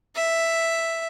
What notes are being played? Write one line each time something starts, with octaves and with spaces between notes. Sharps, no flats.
E5